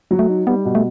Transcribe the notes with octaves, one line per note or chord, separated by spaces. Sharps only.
F#3
A3
D#4
G3 B3
B2
A3